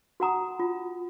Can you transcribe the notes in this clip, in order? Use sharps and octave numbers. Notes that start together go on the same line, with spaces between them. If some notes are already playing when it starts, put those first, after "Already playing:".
F#4 F#5 A#5 D#6
F4